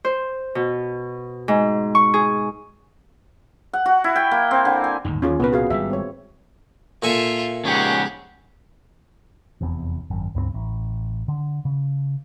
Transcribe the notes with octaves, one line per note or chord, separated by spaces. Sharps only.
C5
B2
G#2
C#6
G#4
F#5
F#4
E4
G5
A#3
C4
D3
G#5
G1 D#2 A2 D#4
D#2 C#4 F4 G#4
C2 A#2 B3 C4 B4
F#4 G#4 F5
G#1 G3 E5
C4 C#5
A#2 F4 A4 E5 G#5
G#2 C#3 G4 G#4 C#5 F#5
F1 E2 C3
G#1 F#2
C#2 G2 A3 C4
A1
D3
C#3